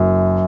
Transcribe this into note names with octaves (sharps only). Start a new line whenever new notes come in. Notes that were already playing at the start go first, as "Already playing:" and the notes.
Already playing: F#1 F#2